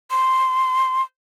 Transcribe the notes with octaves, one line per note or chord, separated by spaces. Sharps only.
C6